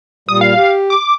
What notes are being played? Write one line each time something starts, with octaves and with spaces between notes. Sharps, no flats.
A#2 G3 D#6
F5
G4
D6